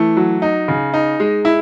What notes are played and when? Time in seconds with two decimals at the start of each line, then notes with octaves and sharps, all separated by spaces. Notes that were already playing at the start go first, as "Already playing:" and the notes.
Already playing: E3 A3
0.17 F#3
0.42 D#4
0.68 C#3
0.94 D#4
1.20 G#3
1.45 E4